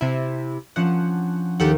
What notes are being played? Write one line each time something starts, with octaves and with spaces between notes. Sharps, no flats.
C3 E4
F3 C#4 D4 F#5
D#2 G4 A4 F#5